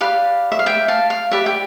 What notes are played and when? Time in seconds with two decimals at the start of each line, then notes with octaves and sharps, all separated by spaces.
0.01 G4 B4 D5 F5
0.52 E5
0.59 F5
0.66 E5 G5
0.88 F5 A5
1.10 F5
1.31 G4 B4 D5 E5
1.46 G5